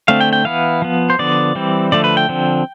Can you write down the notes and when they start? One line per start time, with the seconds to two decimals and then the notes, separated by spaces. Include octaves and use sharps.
0.08 D3 A3 C4 F5
0.20 G5
0.33 G5
0.45 E3 B3 F5
0.82 F3 B3
1.10 C5
1.19 D3 F3 B3 D5
1.55 E3 G3 C4
1.92 D3 F3 A3 D5
2.04 B4
2.17 G5
2.29 D3 F3 C4